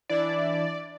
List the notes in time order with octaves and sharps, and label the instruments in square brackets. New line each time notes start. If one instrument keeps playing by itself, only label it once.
[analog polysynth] E3 D4 E4 [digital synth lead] D5